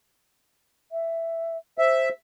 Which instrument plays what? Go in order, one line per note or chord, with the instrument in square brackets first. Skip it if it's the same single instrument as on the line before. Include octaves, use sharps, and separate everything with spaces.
[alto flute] E5
[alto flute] C5 [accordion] E5